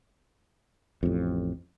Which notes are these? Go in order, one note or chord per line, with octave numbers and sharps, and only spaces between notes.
A1 F2